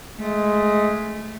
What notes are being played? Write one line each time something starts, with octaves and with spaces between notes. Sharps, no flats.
G#3 A3